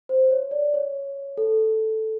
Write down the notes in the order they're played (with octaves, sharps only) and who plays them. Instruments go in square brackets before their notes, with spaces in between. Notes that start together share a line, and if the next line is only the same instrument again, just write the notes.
[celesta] C5
C#5
D5
C#5
A4